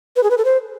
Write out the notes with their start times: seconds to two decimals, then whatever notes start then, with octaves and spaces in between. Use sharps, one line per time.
0.16 B4
0.23 G#4
0.30 B4
0.38 A4
0.45 C5